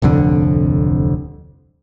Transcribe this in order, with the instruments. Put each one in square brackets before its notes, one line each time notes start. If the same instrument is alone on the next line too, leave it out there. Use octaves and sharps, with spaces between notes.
[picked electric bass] D1 C2 F2 D3